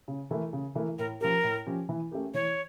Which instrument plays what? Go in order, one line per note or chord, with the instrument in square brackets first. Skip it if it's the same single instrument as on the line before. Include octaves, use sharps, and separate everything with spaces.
[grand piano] C#3
E3 A3 E4 A#4
C#3
E3 A3 E4 A#4
[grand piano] A2 [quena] A#4
[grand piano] F3 C#4 G4 [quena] A#4
[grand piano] A2
F3 C#4 G4
E3
A3 C#4 G4 A#4
[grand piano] E3 [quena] C#5